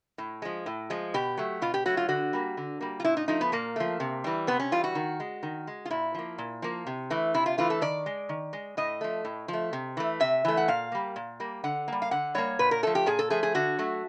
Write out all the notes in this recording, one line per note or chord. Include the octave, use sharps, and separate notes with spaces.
A2
F3 G#3
A2
F3 G#3
B2 G4
F#3 A3
B2 F4
G4
F#3 A3 F#4
F4
D3 F#4
G3 A#3
D3
G3 A#3
F4
A#2 E4
D#4
F3 A3 D#4
B3
A#2 A#3
F3 A3
C3
E3 G3
C3 B3
C#4
E3 G3 F4
F#4
D#3
G#3
D#3
G#3
F4
A#2 E4
F3 A#3
A#2
F3 A#3
C3
E3 A3
C3 E4
F4
E3 A3 F4
A4
D#3 D5
G#3
D#3
G#3
A2 D#5
F3 A3
A2
F3
A3
C3
E3 A3
C3 E5
E3 A3
F#5
A#2 F5
G3 A#3
A#2
G3 A#3
D3 F#5
G3 A#3
F5
D3 F#5
G3 A#3 C#5
A#2 B4
A#4
F3 A3 A4
G4
A#2 G#4
A4
F3 A3 G#4
G#4
D3 F#4
F#3 A3